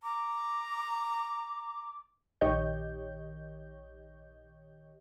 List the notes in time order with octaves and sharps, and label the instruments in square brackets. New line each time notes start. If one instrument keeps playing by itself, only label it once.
[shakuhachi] A#5 [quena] D6
[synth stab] A#1 D#3 G4 C#5 D#5 G6